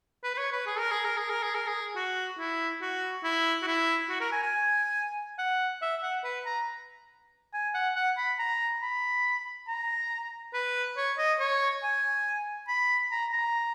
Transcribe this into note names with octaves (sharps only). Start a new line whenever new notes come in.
B4
B4
C#5
B4
G#4
A#4
G#4
A#4
G#4
A#4
G#4
A#4
G#4
F#4
E4
F#4
E4
F#4
E4
F#4
A#4
G#5
G#5
F#5
E5
F#5
B4
A#5
G#5
F#5
F#5
B5
A#5
B5
A#5
B4
C#5
D#5
C#5
G#5
B5
A#5
A#5